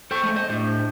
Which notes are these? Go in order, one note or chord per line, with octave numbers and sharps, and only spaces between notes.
A4 C5 G5 C#6
G#3 A3
C5 D#5
A2 D4 G4 C5